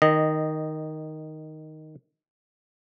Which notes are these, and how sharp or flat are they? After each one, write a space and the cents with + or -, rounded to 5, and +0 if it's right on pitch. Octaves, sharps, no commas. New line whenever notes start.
D#3 +0 D#5 -10